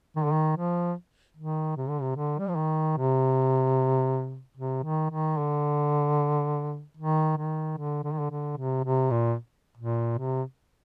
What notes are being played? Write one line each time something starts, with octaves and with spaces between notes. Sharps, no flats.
D#3
D3
D#3
F3
D#3
C3
D3
C3
D3
G3
F3
D#3
C3
C3
D#3
D#3
D3
D#3
D#3
D3
D3
D#3
D3
D3
C3
C3
A#2
A#2
C3